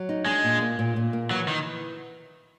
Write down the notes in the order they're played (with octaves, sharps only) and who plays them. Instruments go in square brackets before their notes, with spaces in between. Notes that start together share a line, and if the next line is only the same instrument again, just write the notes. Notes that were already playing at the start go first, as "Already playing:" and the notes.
Already playing: [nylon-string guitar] F#3
D#4
[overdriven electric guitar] G#3 [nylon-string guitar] D4
[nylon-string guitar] A#2
A#3
A#2
A#2
A#3
[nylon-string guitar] E3 [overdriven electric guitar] F#3
[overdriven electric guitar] D#3 [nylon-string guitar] E3